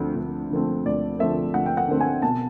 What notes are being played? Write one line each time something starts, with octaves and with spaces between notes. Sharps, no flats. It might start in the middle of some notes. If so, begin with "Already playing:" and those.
Already playing: D2 D3 F3 A3 C4
D2
D3 F3 A3 C4
D2 D5
D3 F3 A3 C4 E5
D2 F#5
G5
F#5
D3 F3 A3 C4
G#5
B2 A5